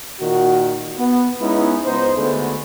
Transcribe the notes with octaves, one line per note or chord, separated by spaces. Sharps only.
A#2 D#3 F#4
B3
G#3 B3 C#4 D#4 E4
C#2 B3 D#4 C5
D2 D3 G#3 A3 B3